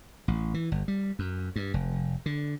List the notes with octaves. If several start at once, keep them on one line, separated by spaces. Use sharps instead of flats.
A1
E3
G1
G3
F#2
G2
F1
D3